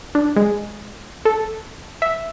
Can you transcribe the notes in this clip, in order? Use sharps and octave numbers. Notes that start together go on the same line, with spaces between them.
D4
G#3
A4
E5